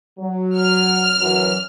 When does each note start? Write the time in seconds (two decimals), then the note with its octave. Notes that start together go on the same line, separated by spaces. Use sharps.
0.19 F#3
0.58 F6
1.19 F#2 E3 F#3